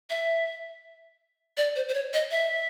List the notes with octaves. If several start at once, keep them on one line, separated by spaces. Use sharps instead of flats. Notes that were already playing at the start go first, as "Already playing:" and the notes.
E5
D5
C5
C5
C#5
D#5
E5